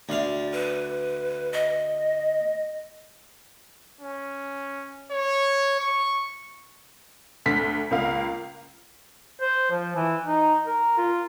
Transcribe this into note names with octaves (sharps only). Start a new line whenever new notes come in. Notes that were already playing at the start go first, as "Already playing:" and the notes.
D2 D5 F5
B4
D#5
C#4
C#5
C#6
D2 B6
C#2 A#3 F5
C5
F3
E3
D#4
A#4
F4